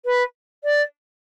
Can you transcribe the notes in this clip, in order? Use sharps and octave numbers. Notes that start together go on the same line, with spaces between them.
B4
D5